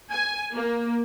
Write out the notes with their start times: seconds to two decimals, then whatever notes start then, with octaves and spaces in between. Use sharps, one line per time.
0.11 G#5
0.54 A#3